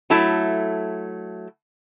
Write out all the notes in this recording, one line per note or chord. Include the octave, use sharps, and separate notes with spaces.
F#3 A3 E4 A5